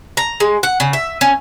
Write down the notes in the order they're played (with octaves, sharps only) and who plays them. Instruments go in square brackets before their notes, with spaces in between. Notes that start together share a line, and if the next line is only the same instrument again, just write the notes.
[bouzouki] A#5
G#3
F#5
C#3
E5
C#4